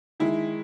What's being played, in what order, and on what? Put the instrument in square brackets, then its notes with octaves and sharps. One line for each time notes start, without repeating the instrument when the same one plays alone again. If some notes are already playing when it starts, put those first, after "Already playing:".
[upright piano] D#3 G#3 E4